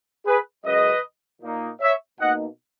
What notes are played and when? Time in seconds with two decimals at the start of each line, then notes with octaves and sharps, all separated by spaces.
0.26 G#4 B4
0.65 F#2 C#3 G#3 B4 D#5
1.42 A#2 A#3 D#4
1.81 C#5 E5
2.20 B2 A#3 D#4 D#5 F#5